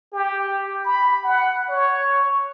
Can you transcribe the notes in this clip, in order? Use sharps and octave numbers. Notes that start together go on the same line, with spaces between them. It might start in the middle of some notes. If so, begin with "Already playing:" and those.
G4
B5
F#5
C#5